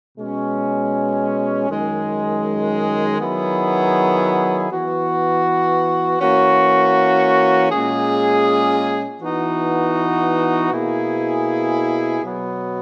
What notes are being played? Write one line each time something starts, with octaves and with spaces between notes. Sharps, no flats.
B2 G#3 C#4
F#2 D#3 G#3
D#3 F#3 B3 E4 G#4
E3 B3 F#4
E3 A#3 C#4 F#4
A#2 G#3 C#4 G#4
E3 B3 D#4 F#4
B2 A#3 E4 G#4
B2 F#3 B3